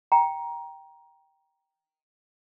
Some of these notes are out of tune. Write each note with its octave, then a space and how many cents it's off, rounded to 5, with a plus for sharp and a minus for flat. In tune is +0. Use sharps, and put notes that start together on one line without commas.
G5 +0 A#5 +15